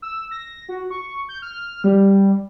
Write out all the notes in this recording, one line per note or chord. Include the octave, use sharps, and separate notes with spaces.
E6
A#6
F#4
C#6
G6
F6
G3